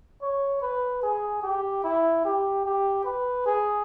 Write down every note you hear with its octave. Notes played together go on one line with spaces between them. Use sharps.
C#5
B4
G#4
G4
E4
G4
G4
B4
G#4